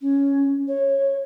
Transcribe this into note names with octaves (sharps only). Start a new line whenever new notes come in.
C#4
C#5